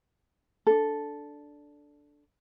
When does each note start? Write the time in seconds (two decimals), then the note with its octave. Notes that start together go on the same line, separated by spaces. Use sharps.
0.67 D4 A4